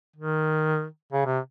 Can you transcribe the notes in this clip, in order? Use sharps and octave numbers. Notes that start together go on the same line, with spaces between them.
D#3
C#3
C3